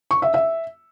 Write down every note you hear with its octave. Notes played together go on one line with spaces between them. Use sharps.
C#6
E5
E5